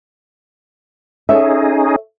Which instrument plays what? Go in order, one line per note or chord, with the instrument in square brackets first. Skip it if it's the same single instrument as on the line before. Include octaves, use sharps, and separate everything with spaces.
[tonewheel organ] C#4 D#4 G#4 [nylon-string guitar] A4 C#5 E5